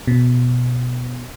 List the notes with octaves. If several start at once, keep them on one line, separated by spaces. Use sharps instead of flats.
B2